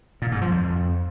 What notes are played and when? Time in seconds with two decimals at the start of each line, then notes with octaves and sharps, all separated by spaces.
0.22 A#2
0.32 G#2
0.42 F3
0.51 F2